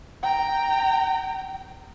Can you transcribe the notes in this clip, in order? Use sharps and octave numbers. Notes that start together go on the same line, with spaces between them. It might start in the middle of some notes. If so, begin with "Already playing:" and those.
G5 A#5